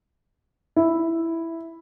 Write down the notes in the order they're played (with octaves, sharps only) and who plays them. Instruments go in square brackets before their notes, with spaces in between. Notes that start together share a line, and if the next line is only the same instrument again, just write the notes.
[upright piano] E4